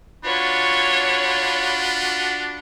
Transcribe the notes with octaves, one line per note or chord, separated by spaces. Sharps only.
D4 F4 F#4 C#5 B5